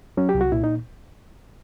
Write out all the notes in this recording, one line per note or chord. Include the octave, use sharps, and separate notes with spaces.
F#3 C#4
G4
C2
F#4
A#2 E4
D#4